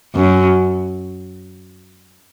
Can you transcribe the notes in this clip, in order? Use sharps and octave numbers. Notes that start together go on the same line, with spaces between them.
F#2